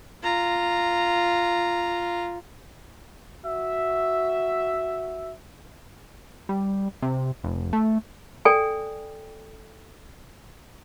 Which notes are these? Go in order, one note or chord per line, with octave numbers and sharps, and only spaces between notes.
F4 A#5
F#4 E5
G3
C3
F1
A3
A4 D5 G5 G#5